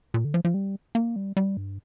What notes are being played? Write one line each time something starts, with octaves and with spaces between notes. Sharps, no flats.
A#2
D3
F3
F3
G3
A#3
G3
G3
G2